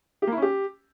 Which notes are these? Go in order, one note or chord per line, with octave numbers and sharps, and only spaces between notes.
G4
A#3
E4
C#4
G4